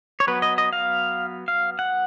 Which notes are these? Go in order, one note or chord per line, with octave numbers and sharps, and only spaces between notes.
C#5
F#3 B3 B4
D#5
D#5
F5
F5
F#5